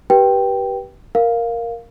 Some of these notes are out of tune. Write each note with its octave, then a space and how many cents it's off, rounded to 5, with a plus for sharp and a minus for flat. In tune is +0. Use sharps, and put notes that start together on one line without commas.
G4 -20 B4 -25 G5 +0
A#4 +0 F5 +0